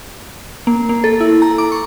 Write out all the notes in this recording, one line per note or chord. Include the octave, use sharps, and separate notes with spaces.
A#3
A#3
A4
E4
A#5
D6
C#6